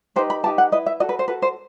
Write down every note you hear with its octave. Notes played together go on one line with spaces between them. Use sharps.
D#4 G4 B4 C5
B5
D#4 G4 B4 A5
F#5
E4 B4 D#5
E5
F#4 A4 D#5
B4
C5
F#4 A4 B4
C5